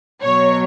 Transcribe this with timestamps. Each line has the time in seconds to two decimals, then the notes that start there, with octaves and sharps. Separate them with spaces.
0.23 B2 F#3 C#5